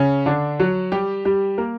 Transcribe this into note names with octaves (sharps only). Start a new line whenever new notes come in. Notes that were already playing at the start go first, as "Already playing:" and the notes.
Already playing: C#3 C#4
D3 D4
F#3 F#4
G3 G4
G3 G4
A#3 A#4